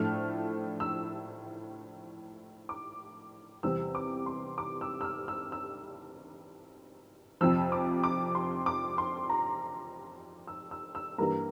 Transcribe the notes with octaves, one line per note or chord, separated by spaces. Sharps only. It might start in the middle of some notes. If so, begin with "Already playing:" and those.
Already playing: A2 F3 A3 D4 F6
E6
D6
E2 C3 G3 C4 E6
D6
C6
D6
E6
E6
F6
E6
E6
F2 C3 F3 E6
D6
D6
C6
D6
C6
A#5
E6
E6
E6
G2 E3 G3 A#3 A#5